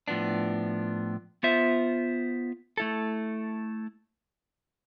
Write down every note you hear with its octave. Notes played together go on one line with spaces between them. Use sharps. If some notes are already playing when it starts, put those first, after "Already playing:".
A2 F3 B3 D4
B3 F4 C5 E5
A3 E4 A4